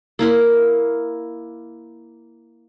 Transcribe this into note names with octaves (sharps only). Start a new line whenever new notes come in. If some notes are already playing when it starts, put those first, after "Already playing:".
A#3 E4 A#4